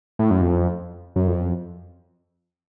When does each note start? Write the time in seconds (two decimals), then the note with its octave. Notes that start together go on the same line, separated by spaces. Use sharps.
0.19 A2
0.31 F#2
0.41 F2
1.16 F#2
1.27 F2